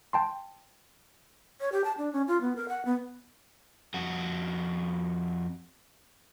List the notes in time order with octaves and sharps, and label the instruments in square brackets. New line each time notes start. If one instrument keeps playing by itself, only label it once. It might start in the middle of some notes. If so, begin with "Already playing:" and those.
[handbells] G5 A5 C6
[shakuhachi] C#5
G4
A5
D4
C#4
F4
B3
A#4
F#5
B3
[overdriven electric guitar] F2 F#4